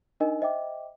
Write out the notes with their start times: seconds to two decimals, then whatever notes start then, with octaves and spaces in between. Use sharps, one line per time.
0.20 D4 D#4 A#4 D#5 G#5
0.41 C5 D#5 E5 G5 D6